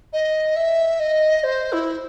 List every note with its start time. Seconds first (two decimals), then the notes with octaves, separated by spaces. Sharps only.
0.12 D#5
0.56 E5
0.99 D#5
1.43 C5
1.72 E4